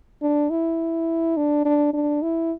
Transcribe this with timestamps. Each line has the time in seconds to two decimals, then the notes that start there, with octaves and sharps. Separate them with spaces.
0.22 D4
0.50 E4
1.37 D4
1.65 D4
1.93 D4
2.22 E4